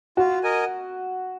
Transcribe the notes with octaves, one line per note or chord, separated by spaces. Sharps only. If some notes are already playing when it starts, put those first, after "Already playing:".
F4 F#4
A#4 D#5 G#5